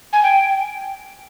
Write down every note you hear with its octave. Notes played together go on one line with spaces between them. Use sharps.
G#5
G5